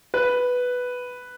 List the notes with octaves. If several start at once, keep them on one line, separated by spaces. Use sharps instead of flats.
B4